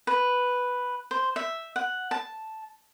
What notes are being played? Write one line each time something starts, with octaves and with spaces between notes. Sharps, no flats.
B4
C5
E5
F#5
A5